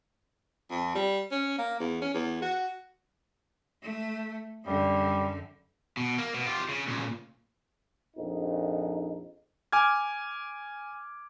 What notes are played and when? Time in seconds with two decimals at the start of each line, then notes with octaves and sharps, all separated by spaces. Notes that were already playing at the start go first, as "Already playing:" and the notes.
0.70 F2
0.95 G3
1.31 C#4
1.58 A#3
1.80 E2
2.02 C#4
2.14 E2
2.42 F#4
3.82 A3
4.64 F#2 D3 G3
5.97 B2
6.18 A#3
6.34 B2
6.46 F4 G4
6.69 C#3
6.88 A#2 C#3
8.16 A#1 F2 D#4
9.72 G#5 D6 F6 G#6